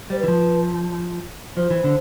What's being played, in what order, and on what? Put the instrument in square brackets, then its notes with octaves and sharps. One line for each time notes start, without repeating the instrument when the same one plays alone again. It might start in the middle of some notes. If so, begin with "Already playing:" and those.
[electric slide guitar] G3 [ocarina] C5
[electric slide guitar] E3 [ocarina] B4
[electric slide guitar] F3
[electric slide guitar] F3 [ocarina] C5
[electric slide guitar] E3
D3